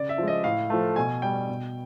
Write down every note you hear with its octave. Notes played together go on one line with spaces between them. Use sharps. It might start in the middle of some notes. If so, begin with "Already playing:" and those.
Already playing: C#3 D5
E5
F3 G#3
D#5
A2 F5
F3 A3
B2 G#5
G3 G5
B2